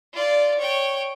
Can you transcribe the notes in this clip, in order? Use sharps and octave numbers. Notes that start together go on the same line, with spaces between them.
F4 D5
C#5 G5